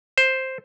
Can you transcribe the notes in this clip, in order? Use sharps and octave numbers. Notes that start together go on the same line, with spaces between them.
C5